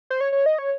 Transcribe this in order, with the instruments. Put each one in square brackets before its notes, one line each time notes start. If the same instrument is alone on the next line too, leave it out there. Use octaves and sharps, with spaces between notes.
[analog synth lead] C5
C#5
C#5
D#5
C#5